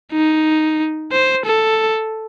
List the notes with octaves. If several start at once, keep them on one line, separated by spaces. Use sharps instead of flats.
D#4
C5
A4